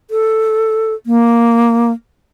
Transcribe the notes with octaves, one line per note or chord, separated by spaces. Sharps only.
A4
A#3